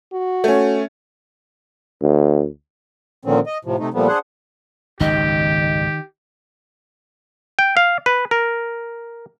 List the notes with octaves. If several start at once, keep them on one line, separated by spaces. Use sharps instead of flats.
F#4
A3 C#4
D2
A#2 D3 D#3 F3 C4 C#4
D#5
A2 C3 F3
C3 A3 D#4
A#2 F3 G3 A3 B3
D4 G#4 C5 F#5
G#1 C#2 F#2 D#3 G4 D#5
G5
F5
B4
A#4